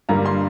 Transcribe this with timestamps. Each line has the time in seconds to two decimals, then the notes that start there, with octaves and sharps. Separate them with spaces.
0.09 G2 D3 G3 A#3 A#5
0.26 C6